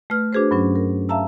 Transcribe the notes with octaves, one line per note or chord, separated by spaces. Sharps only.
A3 B4 F6
D4 F#4 G#4 B4 C5
G2 F#3 C#4
A#4
E5 F5 A5 A#5 E6